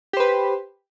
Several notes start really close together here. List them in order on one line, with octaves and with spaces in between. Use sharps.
G4 C5 B4